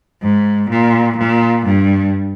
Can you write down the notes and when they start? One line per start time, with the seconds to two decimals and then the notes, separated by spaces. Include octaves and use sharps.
0.22 G#2
0.70 A#2
1.17 A#2
1.65 G2